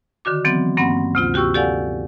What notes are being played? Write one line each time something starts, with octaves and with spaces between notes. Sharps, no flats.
D3 D#3 F#4 D6
E3 F#3 B3 C4
G2 A#3 C4 C#4 F#5 B5
D2 C3 F4
F#4 G4 G5 C#6 E6
G4 A4 D5 F5 F#5 G#5